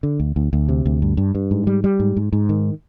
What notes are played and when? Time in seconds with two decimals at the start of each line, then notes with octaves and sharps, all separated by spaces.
0.03 D3
0.20 D2
0.36 D2
0.53 D2
0.69 C3
0.86 D2
1.02 G2
1.17 G2
1.35 G2
1.51 G#2
1.67 G3
1.84 G3
2.00 G#2
2.17 G#2
2.33 G#2
2.49 D#3